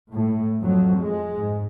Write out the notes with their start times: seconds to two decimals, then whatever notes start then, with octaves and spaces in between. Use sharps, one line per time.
0.12 A2
0.64 F2 F#3
0.99 G#3
1.35 G#2